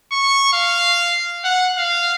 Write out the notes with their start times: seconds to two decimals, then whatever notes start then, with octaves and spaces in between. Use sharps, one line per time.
0.12 C#6
0.53 F5
1.44 F#5
1.78 F5